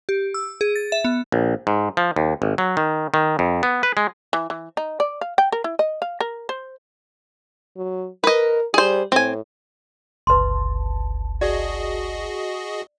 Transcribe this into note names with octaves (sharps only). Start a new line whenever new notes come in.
G4
E6
G#4
A6
E5
B3
A#1
G#2
F3
D#2
G#1
F#3
D#3
D#3
F2
B3
B4
G#3
E3
E3
D#4
D5
F5
G5
A#4
E4
D#5
F5
A#4
C5
F#3
A#4 B4 D#5
G3 G#4 C5
A2 C4 G#5
G1 C#2 B4 A5 C6
F#4 G#4 D5 D#5